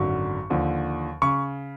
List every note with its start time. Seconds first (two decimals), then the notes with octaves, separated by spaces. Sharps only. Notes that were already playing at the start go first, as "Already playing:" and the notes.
Already playing: G#1 F#2 D3 F#3 C#6
0.50 D#2 D3 F3
1.22 C#3 C#6